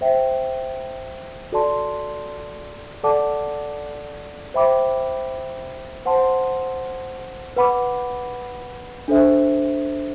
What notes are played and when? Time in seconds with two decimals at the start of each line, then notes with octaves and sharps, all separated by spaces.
0.01 C5 E5 G5
1.52 F#4 A4 D5 A5 C6
3.04 A4 D5 F#5 A5 D6
4.54 C5 E5 G5 B5 D6
6.06 C5 F#5 A5 C6
7.56 B4 F#5 B5 D6
9.08 D4 A4 C5 E5